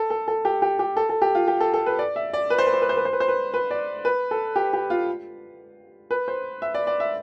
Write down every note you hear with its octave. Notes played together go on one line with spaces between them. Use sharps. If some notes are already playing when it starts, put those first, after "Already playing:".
Already playing: A4
A4
A4
G4
G4
G4
A4
A4
G4
F4
G4
A4
A4
B4
D5
E5
D5
B4
C5
B4
C5
B4
C5
B4
C5
B4
C5
B4
B4
D5
B4
A4
G4
G4
F4
B4
C5
E5
D5
D5
E5